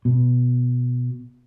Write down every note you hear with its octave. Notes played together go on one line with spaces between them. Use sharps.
B2